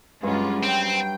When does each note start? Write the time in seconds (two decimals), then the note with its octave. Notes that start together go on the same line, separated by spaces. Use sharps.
0.23 G2 F#3 G#3 C#4 F4
0.63 C4 G5